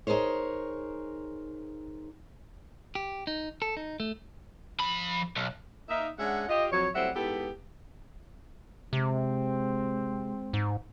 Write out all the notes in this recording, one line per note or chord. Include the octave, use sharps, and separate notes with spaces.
D#4 G#4 A#4 C5 C#5
G4
D#4
A4
D#4
A3
F3 B5
B1
A#3 D#4 E5
G#3 C#4 D4 E5 F#5
F4 G4 D#5
F2 F#3 C#5
A2 F#3 G3 C4 E5 F#5
G#2 B3 E4 G4 A4 B4
C3 G#3 C4
G#2